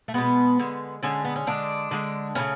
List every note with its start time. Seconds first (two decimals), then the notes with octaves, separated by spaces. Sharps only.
0.08 A3
0.14 B2 G#3 B3
0.59 D3 G#3
1.03 D3 G#3 C#4
1.25 B3
1.36 C#4
1.47 D3 G#3 D4
1.91 D3 G#3
2.35 C#3 E3 A3 C#4